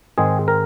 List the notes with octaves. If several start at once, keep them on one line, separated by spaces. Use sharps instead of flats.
G#2 D#3 G#3 C4 G#4
A#4